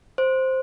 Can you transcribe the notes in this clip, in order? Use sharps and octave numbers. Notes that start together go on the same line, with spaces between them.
C5